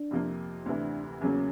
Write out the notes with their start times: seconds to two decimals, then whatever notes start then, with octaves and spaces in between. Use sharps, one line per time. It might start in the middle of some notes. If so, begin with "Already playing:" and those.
Already playing: D4
0.11 F2 C3 F3 A#3
0.66 D2 C3 E3 D4
1.21 E2 C#3 F#3 A#3 C#4